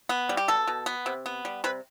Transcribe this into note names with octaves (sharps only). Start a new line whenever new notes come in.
B3
G3
G4
B2 A4
B2
B3
C3
B3
G3
C3 B4